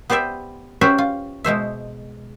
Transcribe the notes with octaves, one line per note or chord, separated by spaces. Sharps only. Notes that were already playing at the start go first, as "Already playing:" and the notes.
B3 G4 C5 D5 E5
C#4 F#4 G4 B4 C5 E5
F4
B2 G#3 C5 E5